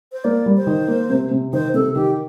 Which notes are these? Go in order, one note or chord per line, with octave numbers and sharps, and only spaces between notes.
C5
A#3 D5
G3
C5
D#3
A#3
C3
C3
D#3 C5
C3 A4
D#3 G4